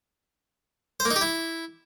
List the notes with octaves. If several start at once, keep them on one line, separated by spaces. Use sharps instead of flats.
C5
A#3
D#4
G4
E4